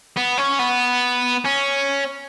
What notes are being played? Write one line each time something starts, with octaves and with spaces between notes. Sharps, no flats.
B3
C#4
B3
C#4